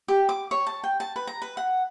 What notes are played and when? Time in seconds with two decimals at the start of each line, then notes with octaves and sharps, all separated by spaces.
0.08 G4
0.29 D6
0.51 C#5
0.67 A5
0.84 G5
1.00 A5
1.16 B4
1.27 A#5
1.42 B4
1.57 F#5